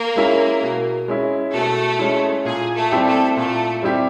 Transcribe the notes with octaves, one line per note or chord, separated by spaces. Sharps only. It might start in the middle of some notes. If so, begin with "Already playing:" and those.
Already playing: A#3 A#4
G#3 C#4 E4
B2
G#3 C#4 E4
B2 A3 A4
G#3 C#4 E4
A#2 G#4
A3 A4
G3 C4 E4 G4
A3 A4
A#2 A3 A4
G3 C4 E4 G4